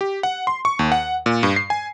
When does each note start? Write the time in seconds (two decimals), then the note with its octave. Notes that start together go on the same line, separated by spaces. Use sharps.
0.01 G4
0.23 F#5
0.47 C6
0.65 C#6
0.79 D#2
0.92 F#5
1.26 A#2
1.43 G2
1.56 C7
1.70 G#5